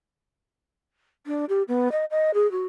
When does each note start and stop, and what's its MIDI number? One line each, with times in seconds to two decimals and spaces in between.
1.26 1.45 62
1.49 1.63 67
1.68 1.91 59
1.92 2.05 75
2.11 2.31 75
2.34 2.50 68
2.51 2.66 66